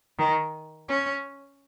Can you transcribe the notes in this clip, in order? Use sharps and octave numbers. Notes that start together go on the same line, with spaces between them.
D#3
C#4